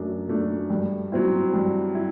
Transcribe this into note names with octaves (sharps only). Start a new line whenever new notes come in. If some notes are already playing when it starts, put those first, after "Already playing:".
Already playing: F#2 F#3 A3 D4
F#3 A3 D4
G2
F#3 C4 E4
G2
E4